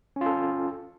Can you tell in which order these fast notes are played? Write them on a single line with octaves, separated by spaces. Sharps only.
C#4 F4 A4